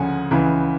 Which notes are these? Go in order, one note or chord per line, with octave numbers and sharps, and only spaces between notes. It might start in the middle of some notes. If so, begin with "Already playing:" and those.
Already playing: D2 C#3 F3 F#5 G#5
C#2 C#3 E3